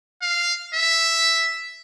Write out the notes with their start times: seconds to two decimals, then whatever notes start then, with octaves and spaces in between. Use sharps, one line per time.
0.22 F5
0.75 E5